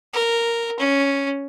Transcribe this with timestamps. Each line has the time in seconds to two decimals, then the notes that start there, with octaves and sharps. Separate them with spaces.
0.13 A#4
0.79 C#4